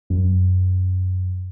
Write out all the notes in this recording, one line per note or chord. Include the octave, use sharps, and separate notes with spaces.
F#2